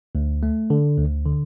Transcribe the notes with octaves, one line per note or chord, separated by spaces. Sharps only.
D2
A3
D3
D2
D3